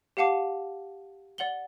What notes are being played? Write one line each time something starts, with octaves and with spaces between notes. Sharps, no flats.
G4 F5 F#5 A5 D6
D5 F#5 F#7 G7